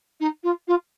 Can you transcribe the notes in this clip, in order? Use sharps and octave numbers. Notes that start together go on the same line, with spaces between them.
D#4
F4
F4